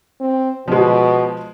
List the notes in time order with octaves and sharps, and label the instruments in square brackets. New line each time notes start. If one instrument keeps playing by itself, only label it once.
[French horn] C4
[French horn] B2 [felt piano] F3 G#3